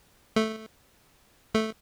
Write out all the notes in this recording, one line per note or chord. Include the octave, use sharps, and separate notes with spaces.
A3
A3